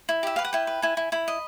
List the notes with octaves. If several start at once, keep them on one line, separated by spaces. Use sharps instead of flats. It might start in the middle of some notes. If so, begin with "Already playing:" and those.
E4
G4 E5
B4 F5
F#5
E4 G5
B4
E4 G#5
E4
E4 B5
D#5